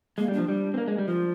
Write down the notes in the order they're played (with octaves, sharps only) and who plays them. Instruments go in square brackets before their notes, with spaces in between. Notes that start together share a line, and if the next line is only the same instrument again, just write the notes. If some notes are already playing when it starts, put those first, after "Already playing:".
[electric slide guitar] G#3 [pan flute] A#3
[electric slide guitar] G3
[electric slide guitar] F3 [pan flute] D4
[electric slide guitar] G3
C4
A#3
G#3
G3
[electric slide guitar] F3 [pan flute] F4